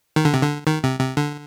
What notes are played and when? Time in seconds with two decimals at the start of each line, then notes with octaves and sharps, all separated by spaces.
0.16 D#3
0.25 D3
0.34 C3
0.42 D3
0.67 D#3
0.84 C3
1.00 C3
1.17 D3